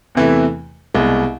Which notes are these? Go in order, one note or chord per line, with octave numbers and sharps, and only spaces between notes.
E2 C3 E3 A3 E4
C2 B2 G#3